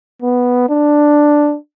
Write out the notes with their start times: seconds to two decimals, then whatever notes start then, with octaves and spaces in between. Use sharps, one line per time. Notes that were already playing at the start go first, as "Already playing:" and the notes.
0.22 B3
0.69 D4